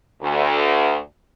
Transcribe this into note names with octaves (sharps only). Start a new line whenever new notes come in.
D2